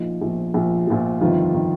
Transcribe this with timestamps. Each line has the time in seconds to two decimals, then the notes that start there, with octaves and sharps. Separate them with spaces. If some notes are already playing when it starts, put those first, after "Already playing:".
Already playing: A#1 A#2 F3 D#4
0.21 A#1 A#2 F3
0.54 A#1 A#2 F3
0.87 A#1 A#2 F3
1.21 G1 F2 D#3 F4
1.54 D#3